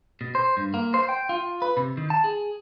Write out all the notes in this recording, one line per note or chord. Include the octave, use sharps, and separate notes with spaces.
B2
C5
G2
A#3
C5
G5
F4
B4
C3
D#3
A5
G#4